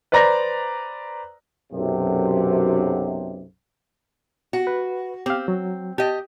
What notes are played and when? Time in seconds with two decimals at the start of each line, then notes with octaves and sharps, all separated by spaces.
0.12 B4 C5 D5 A#5 A#6
1.73 B1 F#2 C3
4.53 F#4
4.67 B4
5.26 C4 G4 F5
5.48 F#3
5.98 G4 D#5 A5